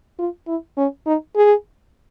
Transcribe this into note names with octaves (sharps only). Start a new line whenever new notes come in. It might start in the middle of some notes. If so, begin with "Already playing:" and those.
F4
E4
C#4
D#4
G#4